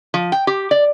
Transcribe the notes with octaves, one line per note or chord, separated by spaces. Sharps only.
F3
G5
G4
D5